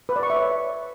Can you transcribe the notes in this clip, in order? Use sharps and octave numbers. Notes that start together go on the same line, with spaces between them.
B4
D5
C#6
E5
C#5